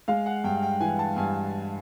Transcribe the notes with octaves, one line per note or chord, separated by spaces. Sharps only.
G#3 F5
F#5
G2 G5
G5
E3 G#5
A5
G2 G#5